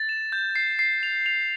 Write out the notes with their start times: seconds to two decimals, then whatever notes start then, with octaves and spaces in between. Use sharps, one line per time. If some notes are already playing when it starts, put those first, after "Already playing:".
Already playing: A6
0.09 E7
0.32 G6
0.56 C7
0.79 C7
1.03 F7
1.26 F7